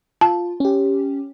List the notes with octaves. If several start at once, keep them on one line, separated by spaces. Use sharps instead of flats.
F4 A5
C#4 G4